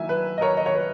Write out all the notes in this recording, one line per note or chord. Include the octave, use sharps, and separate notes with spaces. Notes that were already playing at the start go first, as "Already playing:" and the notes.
Already playing: D#3 F#3 A#3 E4 E5 G#5
B4
D#5
A#4 C#5
D#5
C#5
B4